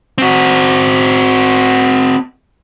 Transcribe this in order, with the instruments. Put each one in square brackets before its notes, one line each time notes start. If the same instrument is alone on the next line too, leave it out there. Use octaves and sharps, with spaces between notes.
[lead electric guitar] C4 F#4